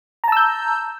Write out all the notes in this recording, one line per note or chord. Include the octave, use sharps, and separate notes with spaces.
A5 A#5 E6 G6